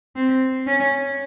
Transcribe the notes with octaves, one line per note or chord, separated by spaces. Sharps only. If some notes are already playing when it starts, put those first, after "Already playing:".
C4
C#4